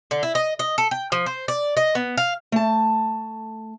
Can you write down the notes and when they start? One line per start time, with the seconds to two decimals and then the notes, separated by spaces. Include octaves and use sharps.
0.11 D3
0.23 E4
0.35 D#5
0.59 D#5
0.78 A4
0.91 G5
1.12 F3
1.26 C5
1.48 D5
1.77 D#5
1.95 B3
2.17 F5
2.52 A3 A5